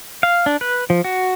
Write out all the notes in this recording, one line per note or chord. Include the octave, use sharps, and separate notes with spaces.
F5
D4
B4
F3
F#4